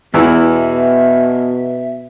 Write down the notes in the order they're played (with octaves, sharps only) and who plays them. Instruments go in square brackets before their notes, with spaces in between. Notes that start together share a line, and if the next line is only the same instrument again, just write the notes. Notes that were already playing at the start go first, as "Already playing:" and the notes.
[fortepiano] E2 E3 E4 [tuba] B2 [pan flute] E5